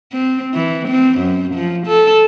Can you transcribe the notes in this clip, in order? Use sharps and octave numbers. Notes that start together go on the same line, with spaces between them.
C4
E3
C4
F#2
F3
A4